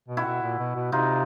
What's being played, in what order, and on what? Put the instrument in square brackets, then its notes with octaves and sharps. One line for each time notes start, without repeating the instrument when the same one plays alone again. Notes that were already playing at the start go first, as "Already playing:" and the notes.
[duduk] B2
[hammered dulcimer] E4 F#4
[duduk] B2
A#2
B2
B2
[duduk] C3 [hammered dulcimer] D#4 F4